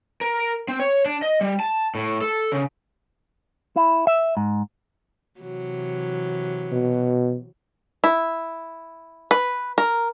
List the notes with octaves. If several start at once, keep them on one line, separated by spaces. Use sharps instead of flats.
A#4
C4
C#5
D4
D#5
G3
A5
A2
A4
C#3
E4
E5
G#2
C3 E3 F#3
B2
E4
B4
A#4